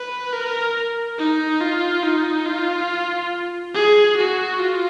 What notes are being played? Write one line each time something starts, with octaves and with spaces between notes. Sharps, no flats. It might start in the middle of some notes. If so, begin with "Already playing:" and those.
Already playing: B4
A#4
D#4
F4
D#4
F4
G#4
F#4
F4